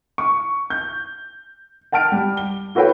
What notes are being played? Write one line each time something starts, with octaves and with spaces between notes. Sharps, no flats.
C#6
G6
F#5 G5 A5 F6 D7
G3
G7
E4 F#4 A4 B4 C#5 G5